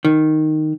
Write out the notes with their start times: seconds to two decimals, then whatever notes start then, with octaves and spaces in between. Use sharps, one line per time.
0.05 D#3